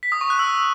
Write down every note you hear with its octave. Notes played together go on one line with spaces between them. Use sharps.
B6
D#6
C#6
F#6
E6